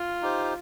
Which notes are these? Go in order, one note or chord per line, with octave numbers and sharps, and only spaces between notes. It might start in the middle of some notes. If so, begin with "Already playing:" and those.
Already playing: F4
D#4 G4 C5